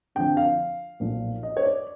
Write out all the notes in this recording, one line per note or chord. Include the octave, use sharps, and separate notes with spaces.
F2 D3 F3 G5
F5
B1 A#2 F3
D#5
C#5
D5